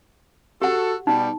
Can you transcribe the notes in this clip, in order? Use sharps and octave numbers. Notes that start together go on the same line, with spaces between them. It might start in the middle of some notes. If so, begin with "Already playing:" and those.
F#4 G4 A4 F#5
B2 G3 D#4